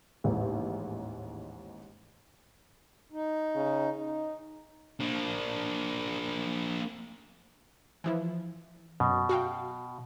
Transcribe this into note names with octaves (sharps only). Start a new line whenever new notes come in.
A1 D#2 G#2
D#4
C#3
D#4
A#3 D4
E3 F3 E4
F#2 B2
F#4 F5 G5